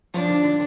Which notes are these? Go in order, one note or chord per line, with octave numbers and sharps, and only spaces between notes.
F3 D4
D3
D3